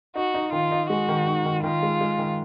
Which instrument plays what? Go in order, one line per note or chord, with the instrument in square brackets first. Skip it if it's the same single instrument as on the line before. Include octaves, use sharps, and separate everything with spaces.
[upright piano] D#4 [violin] F#4
[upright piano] D#4
[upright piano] D#3 [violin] F4
[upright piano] D#4
[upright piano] G#3 [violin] F#4
[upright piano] D#3
D#4
D#3
[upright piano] D#3 [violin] F4
[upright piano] G#3
G#3
D#3